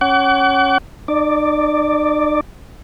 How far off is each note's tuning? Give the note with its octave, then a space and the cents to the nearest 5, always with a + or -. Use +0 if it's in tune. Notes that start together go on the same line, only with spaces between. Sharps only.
C#4 -5 F#5 +30 D6 -40
D#4 -45 D5 +0